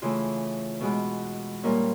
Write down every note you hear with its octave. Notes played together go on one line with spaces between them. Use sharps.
C#3 E3 A3 F4
B2 G#3 B3
A#2 G3 A#3 C#4 A#4